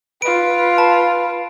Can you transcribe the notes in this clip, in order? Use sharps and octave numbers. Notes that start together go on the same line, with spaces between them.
F4 B4 D7
A5